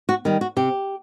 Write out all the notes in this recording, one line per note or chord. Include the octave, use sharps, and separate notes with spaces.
F#4
D#3 G3
F#4
C3 G4